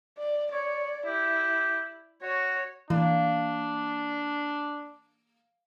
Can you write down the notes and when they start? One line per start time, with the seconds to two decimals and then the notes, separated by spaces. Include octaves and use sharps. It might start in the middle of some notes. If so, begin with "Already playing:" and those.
0.19 D5
0.53 C#5 D5
1.07 E4 G4
2.23 F#4 C#5
2.90 E3 A#3 D4